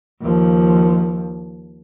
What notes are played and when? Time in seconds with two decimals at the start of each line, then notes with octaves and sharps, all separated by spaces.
0.21 D#2 F3